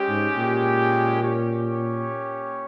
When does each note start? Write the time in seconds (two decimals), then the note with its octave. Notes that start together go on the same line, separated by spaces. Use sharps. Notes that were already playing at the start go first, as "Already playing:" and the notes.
Already playing: G#3 C#4 G4
0.09 G#2
0.38 A#2
1.22 C#4 G4 C#5